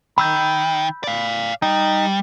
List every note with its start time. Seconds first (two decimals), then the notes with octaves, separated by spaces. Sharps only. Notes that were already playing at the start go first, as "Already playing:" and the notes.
0.18 D#3 B5 E6 G6
1.04 D5 F5
1.62 G3 D#4